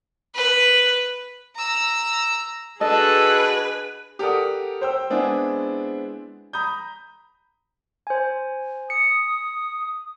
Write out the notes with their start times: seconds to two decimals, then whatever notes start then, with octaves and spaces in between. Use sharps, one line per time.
0.36 B4
1.56 A#5 E6
2.81 D4 F#4 G#4 A4 B4 D#5
4.19 G4 A4 A#4 D5 F#5 D#6
4.81 C5 G5 E6
5.10 G#3 B3 C4 D4 E4 G#4
6.53 A#5 B5 D#6 G6
8.07 C5 G#5
8.90 D#6 C#7